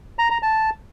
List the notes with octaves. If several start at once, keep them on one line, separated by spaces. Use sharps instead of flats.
A#5
A#5
A5